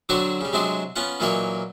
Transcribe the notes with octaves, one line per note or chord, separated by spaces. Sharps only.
D3 F#3 C4 D4 F#4 C#5
C#3 G3
C3 F#3 G#3 C4 D4 G#4
B3 C#4 F4 F#5
A#2 E3 F#3 A#3 D#4 C#5